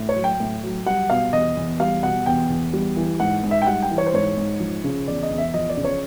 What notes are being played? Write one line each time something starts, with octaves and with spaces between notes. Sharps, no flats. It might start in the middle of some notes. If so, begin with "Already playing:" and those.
Already playing: A2
C#5
F#3
G5
A2
F#3
G3 F#5
B2 F5
E2 D#5
E2
G3 F5
B2 F#5
E2 G5
E2
G3
E3
G#2 F#5
G#2
E5
G5
G3 F#5
G5
E3
C#5
C5
G#2 C#5
G#2
F3
C#3
E2 D5
D#5
E2
E5
F3 D#5
D5
C#3
C#5